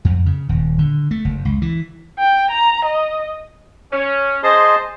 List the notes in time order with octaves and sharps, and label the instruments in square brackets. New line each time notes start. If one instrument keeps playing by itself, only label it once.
[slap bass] F2
C#3
D#1
D3
A3
F#1
C#2
E3
[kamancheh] G5
A#5
D#5
[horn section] C#4
[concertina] G#4 D#5 A5 [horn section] C5